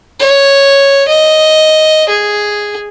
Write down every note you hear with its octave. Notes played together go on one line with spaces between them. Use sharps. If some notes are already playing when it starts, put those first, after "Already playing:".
C#5
D#5
G#4